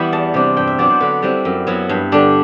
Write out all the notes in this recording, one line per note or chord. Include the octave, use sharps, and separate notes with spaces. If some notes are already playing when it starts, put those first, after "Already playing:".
Already playing: E3 G3 B3 E4 G5 B5
E2 A5
C3 G3 D4
G2 G5
E5
F#3 B3 D4 D5
C5
D3 B4
G3 C4 E4
F#2
F#3 B3 E4
G2
D3 G3 D4